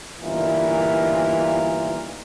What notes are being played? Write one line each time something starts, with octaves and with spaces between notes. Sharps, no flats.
G1 A#2 D#3 E3 A#4